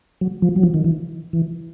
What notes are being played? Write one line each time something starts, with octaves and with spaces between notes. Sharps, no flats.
F#3
F3
F#3
F3
D#3
E3
E3